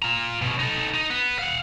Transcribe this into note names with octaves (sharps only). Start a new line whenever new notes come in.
F4 A#5
B2 C#4
D#4 A4
D#4
B3
F5 F#5